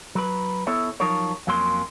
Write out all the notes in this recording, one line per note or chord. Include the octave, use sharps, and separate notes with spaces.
F#3 B4
B3 E4 A4 C#5 E5
F3 F#3 D#4 F4 A#4 C#5
F2 F#3 A#3 C#4 C6